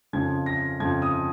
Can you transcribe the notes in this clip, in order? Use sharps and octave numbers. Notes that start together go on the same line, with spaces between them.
F2 C#3 F3 G#6
A#6
F2 C#3 F3 G#6
D#6